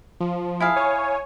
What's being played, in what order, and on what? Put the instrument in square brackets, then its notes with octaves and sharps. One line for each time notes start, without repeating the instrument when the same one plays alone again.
[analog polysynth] F3
[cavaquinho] E4 G#4 F5
[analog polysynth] C#5 G#5